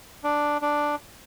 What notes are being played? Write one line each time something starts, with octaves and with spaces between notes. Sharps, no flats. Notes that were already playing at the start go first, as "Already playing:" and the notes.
D4
D4